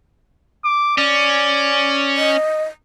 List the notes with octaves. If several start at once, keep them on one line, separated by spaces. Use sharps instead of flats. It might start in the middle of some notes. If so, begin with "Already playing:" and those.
D6
C#4 D5
D#5